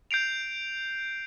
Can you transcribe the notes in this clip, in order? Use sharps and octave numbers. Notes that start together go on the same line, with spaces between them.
G6 C7 D7 F7